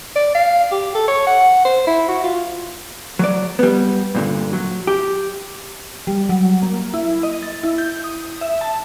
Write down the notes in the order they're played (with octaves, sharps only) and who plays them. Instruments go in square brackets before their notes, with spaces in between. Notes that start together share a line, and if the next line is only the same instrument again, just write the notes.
[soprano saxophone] D5
F5
G4
A4
C#5
F#5
C5
E4
F#4
F4
[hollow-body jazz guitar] F#3 D5
G3 B3
G2 A#2 D3
F#3
G4
[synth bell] G3
F#3
A#3
E4
D#5
A6
E4
G6
D#6
E5
A5